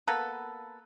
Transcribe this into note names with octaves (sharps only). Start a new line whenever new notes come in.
A#3 B3 A4 B4